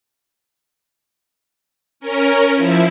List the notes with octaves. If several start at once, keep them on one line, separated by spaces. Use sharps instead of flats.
C#4 A#4
F3 E4